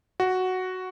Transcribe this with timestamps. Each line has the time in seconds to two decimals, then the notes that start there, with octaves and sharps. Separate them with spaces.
0.20 F#4